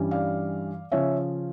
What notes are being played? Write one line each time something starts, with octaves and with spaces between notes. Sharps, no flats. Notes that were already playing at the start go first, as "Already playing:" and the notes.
Already playing: G2 E3 G3 C#4
D5 F5
C#3 F3 C#4 C#5 E5